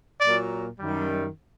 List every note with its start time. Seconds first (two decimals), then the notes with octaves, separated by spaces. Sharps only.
0.21 A#2 F#3 A#3 D5
0.80 F#2 D#3 G3